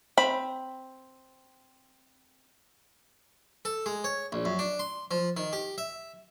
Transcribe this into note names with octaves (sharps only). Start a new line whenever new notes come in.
C4 B5
A4
G#3
C#5
A#1
F#2
D4
C6
F3
D#3
G4
E5